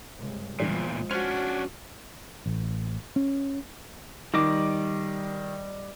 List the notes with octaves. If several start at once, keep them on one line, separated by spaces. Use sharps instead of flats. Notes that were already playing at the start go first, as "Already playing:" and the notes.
C#2 G2 C3
E2 A#2 D3 E3 F3 G3 G#3
C#4 D4 F#4 C5 F6 F#6
A1
C#4
D#3 G3 D#5 D6